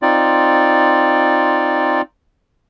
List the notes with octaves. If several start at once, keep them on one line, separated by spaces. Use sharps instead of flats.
C4 D#4 F4 D5